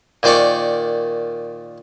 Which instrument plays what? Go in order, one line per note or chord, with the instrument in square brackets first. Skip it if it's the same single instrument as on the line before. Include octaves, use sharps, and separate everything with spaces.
[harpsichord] A#2 D#3 C5 D5 C#6